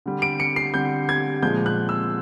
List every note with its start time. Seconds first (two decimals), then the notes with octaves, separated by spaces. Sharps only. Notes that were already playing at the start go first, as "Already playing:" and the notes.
0.06 D3 G3
0.22 D7
0.40 C#7
0.56 C7
0.74 D3 G3 G6
1.09 G#6
1.43 A#2 F3 G#3 G6
1.66 F#6
1.89 E6